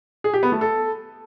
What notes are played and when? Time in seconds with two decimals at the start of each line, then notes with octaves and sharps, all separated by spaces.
0.24 G#4
0.34 G4
0.43 B3
0.52 A3
0.61 A4